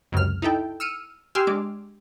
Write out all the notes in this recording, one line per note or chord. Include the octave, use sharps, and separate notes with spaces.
C#2 F#2 C3 F6
D#4 E4 A4 G5
E6 F6 C#7 D#7
G4 G#5 C6 E6 F6
G#3 D4 D6